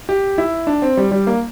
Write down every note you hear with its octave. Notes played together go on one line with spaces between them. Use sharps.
G4
E4
D4
C4
G3
G3
A#3